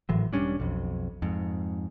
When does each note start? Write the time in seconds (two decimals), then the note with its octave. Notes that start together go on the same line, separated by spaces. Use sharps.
0.09 G#1 A2 E3 F#3
0.33 E1 G3 C#4 D4
0.60 B1 F2
1.22 F2 G#2